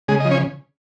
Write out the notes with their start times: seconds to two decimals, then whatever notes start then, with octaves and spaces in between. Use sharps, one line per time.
0.08 C#3 G#3 G#4
0.20 F3 D#5
0.31 C#4 C#5